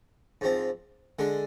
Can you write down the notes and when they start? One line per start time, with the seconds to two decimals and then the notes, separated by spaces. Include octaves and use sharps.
0.41 G#2 F3 C4
1.19 D3 G#3 D4